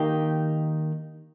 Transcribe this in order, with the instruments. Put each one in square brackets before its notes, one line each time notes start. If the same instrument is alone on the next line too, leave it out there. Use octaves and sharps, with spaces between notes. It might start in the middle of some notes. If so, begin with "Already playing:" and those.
Already playing: [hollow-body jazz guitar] D#3 A#3 D#4 G4